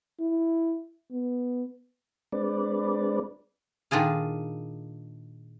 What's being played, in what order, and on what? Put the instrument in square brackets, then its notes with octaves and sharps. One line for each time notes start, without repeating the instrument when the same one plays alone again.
[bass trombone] E4
B3
[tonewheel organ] G#3 C4 D4 B4 D5
[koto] A#2 D#3 D4 F4 G#4 F5